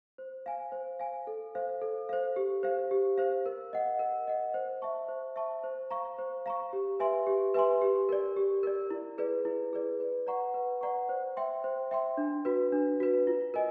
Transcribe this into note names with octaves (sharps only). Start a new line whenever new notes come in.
C5
F5 G#5
C5
F5 G#5
A4
C5 F5
A4
C5 F5
G4
C5 F5
G4
C5 F5
A#4
D#5 F#5
A#4
D#5 F#5
C5
E5 A5 C#6
C5
E5 A5 C#6
C5
F5 A#5 C#6
C5
F5 A#5 C#6
G4
B4 E5 G#5 C6
G4
B4 E5 G#5 C6
G4
A#4 D5
G4
A#4 D5
E4
G#4 B4 D5
E4
G#4 B4 D5
B4
D5 F#5 A#5 C#6
B4
D5 F#5 A#5 C#6
C5
E5 G5 C6
C5
E5 G5 C6
D4
F#4 B4
D4
F#4 B4
F4
A#4 D#5 G#5